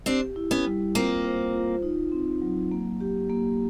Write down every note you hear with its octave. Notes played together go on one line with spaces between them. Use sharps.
C4 D4 G4
E4
B3 C#4
G3
A#3 C4 F4
C5
F4
D#4
C4
F#3
A#3
G4
A#3